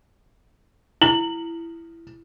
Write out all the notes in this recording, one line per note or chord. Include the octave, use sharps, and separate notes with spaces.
E4 F#7